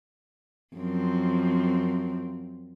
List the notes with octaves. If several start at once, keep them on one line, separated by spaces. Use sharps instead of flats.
F#2 F3 C4